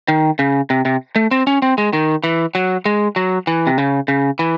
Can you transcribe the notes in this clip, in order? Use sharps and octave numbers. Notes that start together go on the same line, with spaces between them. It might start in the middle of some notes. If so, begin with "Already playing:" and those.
D#3
C#3
C3
C3
A3
C4
C#4
C4
G#3
D#3
E3
F#3
G#3
F#3
E3
C3
C#3
C#3
E3